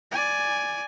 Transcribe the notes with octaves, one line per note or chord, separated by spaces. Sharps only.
D5 G#5